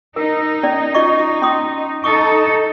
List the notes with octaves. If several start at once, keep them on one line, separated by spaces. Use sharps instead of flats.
D#4 A#4
C#4 D5
F4 D#5 C#6
C#4 C6 D#6
D#4 A4 C#6 D#6